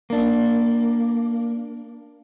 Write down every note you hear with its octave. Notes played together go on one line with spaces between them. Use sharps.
A#3 D4